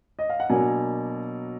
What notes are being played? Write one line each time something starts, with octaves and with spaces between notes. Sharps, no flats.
D#5
F5
F#5
B2 F#3 A#3 D4 G#5